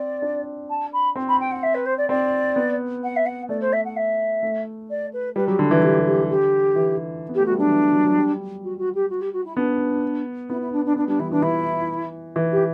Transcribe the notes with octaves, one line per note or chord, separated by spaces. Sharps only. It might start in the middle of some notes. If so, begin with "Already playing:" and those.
Already playing: C4 D5
D4
A5
B5
C4
B5
G5
F#5
E5
B4
C5
D5
C4 D5
B3
F#5
E5
F#5
A3 D5
C5
E5
F#5
E5
A3
D5
B4
G3 B4
F#3 G4
D3 E4
E3
D3 G4
G4
G4
E3
B3
G4
A3
F#4
G3
F#3 D4
E3
F#3
F#3
G3
F#4
F#4
G4
F#4
G4
F#4
E4
B3 D4
B3 E4
E4
D4
D4
B3 D4
G3 D4
E3 E4
E3 D4
E3 E4
E3
G4